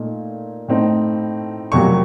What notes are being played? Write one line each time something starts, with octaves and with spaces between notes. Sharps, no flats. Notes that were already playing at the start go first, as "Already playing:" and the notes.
Already playing: A#2 A3 D#4
A2 A3 C4 D#4
F1 F2 C3 F#3 A#3 C#6